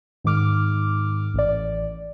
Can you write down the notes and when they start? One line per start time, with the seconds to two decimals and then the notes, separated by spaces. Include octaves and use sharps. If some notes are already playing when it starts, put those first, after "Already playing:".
0.24 G#2 D#3 D6 F6
1.34 A1 D5